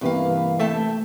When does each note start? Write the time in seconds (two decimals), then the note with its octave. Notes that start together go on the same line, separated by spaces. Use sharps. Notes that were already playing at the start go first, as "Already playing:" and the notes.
0.01 G2 C3 E3 A#3 B4 F5
0.59 A3 E5 G5 A5